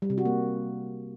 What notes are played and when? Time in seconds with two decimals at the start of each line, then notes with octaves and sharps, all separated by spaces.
0.02 G3
0.10 C3
0.18 F#4
0.25 A#3